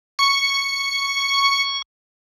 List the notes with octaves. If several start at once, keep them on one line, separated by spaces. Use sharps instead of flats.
C#6 C#7